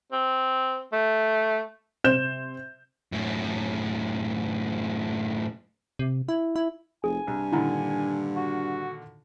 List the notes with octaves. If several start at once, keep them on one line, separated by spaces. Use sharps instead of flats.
C4
A3
C3 C5 G6 E7
F#2 A2
C3
E4
E4
F1 G#4 G#5
C2 G2
A#2 D3 D#3 E4 A#5
F#4